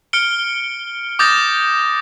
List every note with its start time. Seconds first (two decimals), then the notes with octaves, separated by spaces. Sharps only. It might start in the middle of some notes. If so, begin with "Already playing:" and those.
0.13 F6 C#7 D7 G7
1.19 D6 D#6 G6 A6 A#6